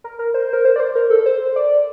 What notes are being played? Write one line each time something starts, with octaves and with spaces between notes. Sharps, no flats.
A#4
A#4
C5
A#4
C5
D5
C5
A#4
A4
C5
D5